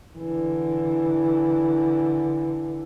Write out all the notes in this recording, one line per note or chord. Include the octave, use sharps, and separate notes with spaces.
D3 E3